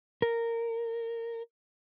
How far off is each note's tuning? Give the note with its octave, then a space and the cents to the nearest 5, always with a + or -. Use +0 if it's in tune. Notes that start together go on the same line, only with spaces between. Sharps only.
A#4 -15